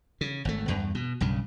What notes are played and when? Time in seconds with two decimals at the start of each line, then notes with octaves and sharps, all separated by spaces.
0.21 C#3
0.45 G#1 A3
0.68 E2 G2
0.95 B2
1.21 B1 G2 C#3